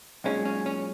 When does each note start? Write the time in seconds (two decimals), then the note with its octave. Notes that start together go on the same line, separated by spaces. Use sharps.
0.24 B1 A#2 G#3 C#4
0.45 C#4
0.66 C#4